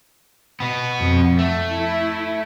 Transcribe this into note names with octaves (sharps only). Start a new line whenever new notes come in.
B2 B3
F2
A3
E4